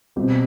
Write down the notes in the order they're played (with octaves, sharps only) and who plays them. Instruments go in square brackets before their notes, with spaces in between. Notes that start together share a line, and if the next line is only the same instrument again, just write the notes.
[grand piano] B2 G3 C4 G4